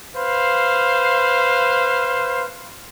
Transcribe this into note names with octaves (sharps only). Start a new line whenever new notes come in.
B4 C5 F5